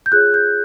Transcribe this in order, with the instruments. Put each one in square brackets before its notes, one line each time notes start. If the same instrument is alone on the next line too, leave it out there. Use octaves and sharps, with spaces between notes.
[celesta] G6
F4 G#4 C#5 F#6
G6